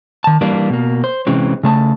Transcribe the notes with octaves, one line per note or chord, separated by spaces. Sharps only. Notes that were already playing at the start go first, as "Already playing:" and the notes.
D#3 A5
E3 G3 A#3 D4
B2 A#3
C5
C3 E3 G#3 C4 C#4
C#3 A3 A5